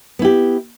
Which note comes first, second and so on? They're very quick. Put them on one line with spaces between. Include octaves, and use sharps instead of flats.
B3 E4 G4